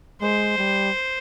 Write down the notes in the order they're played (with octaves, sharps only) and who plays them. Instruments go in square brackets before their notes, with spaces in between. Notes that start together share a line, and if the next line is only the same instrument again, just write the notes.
[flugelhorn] G#3 [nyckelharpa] C5
[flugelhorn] G3